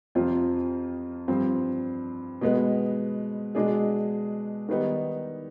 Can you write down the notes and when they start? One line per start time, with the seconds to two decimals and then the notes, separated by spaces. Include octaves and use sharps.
0.15 F2 C3 F3 C4 F4
1.28 G2 F3 C4
2.41 B2 G#3 B3
3.55 B2 G#3 D4 G#4
4.69 D#3 G3 B3 D#4